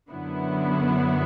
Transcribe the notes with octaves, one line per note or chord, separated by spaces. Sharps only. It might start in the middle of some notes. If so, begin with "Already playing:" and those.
F#2 D3 F#3 B3 E4